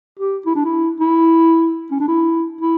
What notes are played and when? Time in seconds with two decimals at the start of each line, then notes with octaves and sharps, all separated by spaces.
0.19 G4
0.46 E4
0.56 D4
0.65 E4
1.00 E4
1.91 C#4
2.00 D4
2.08 E4
2.61 E4